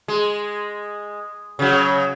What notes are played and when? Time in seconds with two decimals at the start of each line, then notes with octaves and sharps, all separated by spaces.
0.08 G#3
1.59 C#3 F#3